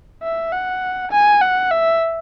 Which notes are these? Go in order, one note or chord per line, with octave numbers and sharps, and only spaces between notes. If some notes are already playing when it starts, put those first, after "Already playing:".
E5
F#5
G#5
F#5
E5